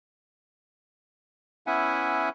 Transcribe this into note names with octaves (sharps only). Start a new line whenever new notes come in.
B3 C#4 E4 E5 F#5 G#5